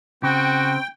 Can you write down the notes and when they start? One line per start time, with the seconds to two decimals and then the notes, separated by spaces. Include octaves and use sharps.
0.23 C#3 C4 F#4 G5